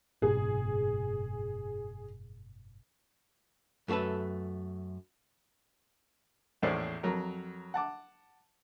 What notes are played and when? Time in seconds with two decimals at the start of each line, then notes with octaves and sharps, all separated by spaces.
0.22 F#1 G#2 B2 G#4
3.88 F#2 A3 F4 A4 B4
6.62 A#1 E2 A2 C#4 C5 D5
7.03 F2 F#3 A#4
7.74 F#5 A5 D6